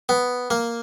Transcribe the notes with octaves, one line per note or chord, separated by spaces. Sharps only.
B3
A#3